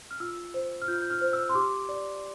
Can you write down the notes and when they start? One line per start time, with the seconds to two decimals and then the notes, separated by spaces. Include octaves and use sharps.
0.11 F6
0.20 F4 E6
0.54 C5
0.82 F6
0.88 F4 G6
1.02 G6
1.11 F6
1.21 C5
1.33 E6
1.49 C6
1.55 G4 D6
1.89 D5